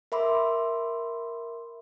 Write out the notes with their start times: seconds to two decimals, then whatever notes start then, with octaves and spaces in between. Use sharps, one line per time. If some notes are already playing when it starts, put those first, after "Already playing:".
0.12 A#4 E5 B5 C6 D6